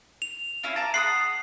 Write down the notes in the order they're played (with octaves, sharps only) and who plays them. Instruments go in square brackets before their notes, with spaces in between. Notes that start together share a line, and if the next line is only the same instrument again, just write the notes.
[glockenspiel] F7
[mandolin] C#4 E4 F4
A5 A#5 D6
[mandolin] F#5 B5 D#6 [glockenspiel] C7